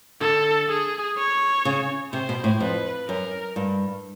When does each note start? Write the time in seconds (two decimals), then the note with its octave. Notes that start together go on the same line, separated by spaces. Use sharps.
0.21 D3 A4
0.69 G#4
1.18 C#5
1.65 C#3
2.13 C3 C5
2.29 B2
2.44 A2
2.60 F2 B4
3.08 F#2 A#4
3.56 G2